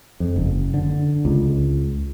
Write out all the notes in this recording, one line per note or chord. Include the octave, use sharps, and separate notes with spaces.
F2
F#1
D3
C#2